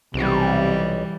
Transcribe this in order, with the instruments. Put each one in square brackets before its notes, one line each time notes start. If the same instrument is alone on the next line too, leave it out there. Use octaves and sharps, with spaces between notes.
[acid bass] B1 [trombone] C3 [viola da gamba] E3 G3